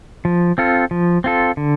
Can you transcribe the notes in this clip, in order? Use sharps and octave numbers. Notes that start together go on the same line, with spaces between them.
F3
C4 F4 A4
F3
C4 F4 A4
D3